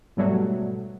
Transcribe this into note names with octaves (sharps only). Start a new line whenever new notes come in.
G#2 B2 F#3 G3 A3 F#4